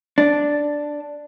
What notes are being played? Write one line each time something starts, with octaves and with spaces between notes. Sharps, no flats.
D4